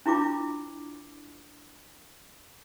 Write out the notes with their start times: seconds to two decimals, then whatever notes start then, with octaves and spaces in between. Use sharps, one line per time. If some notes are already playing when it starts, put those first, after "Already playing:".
0.06 D4 E4 F4 D6